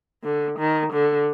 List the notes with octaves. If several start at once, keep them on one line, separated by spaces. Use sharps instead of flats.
D3
D#3
D3